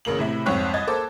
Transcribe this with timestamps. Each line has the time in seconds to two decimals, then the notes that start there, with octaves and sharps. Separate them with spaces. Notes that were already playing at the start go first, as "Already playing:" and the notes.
0.05 A1 C#3 A#3 F#7
0.19 A2 C3 E4
0.46 C2 F2 G#2 C4 C#5 F#6
0.74 C2 D#5 G#6 A6
0.87 A#3 A4 C5 D6